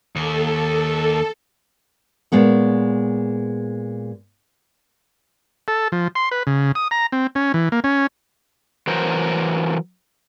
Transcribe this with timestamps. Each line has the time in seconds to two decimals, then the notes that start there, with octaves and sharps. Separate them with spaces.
0.16 D#2 A4
2.32 A#2 G#3 B3 C#5
5.68 A4
5.92 F3
6.15 C6
6.31 B4
6.47 C#3
6.75 D#6
6.91 A#5
7.12 C4
7.35 C#4
7.54 E3
7.72 A#3
7.84 C#4
8.87 E3 F#3 A#4 C5